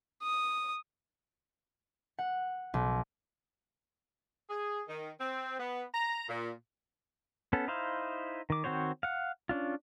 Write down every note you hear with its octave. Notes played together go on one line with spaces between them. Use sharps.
D#6
F#5
B1
G#4
D#3
C4
B3
A#5
A#2
B3 C#4 A4
D#4 E4 C5 F5
D#3 D6
D#3 C4 F#4 C5 C#5
F5 F#5
C#4 D4 F4